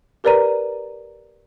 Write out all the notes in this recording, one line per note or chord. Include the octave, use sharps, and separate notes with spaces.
G4 A#4 B4 D5 A#5 D#7